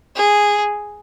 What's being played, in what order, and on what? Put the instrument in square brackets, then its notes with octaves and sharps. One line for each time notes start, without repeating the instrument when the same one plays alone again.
[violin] G#4